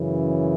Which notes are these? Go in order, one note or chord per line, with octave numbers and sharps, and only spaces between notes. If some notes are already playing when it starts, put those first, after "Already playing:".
Already playing: F#2 C#3 E3